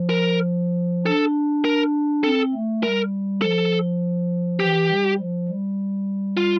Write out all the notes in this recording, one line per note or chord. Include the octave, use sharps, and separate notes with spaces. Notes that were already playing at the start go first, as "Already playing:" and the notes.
Already playing: F3
A#4
D4 A4
A#4
C4 A4
A3
G3 A#4
F3 A4
E3 G4
G3
F3
G3
F4